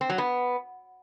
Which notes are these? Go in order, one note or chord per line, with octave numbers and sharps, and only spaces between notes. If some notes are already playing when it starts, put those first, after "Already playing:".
C4
F#3
B3